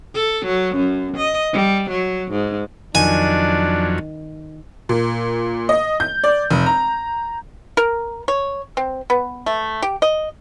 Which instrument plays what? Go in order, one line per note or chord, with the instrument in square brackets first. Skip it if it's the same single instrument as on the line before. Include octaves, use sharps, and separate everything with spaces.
[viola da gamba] A4
F#3
F#2
D#5
G3
F#3
G#2
[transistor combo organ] F2 F#3 [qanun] D#3 [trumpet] D4 [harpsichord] G#5
[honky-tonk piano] A#2
D#5
G6
D5
F1
A#5
[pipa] A#4
C#5
C4
B3
A3
G4
D#5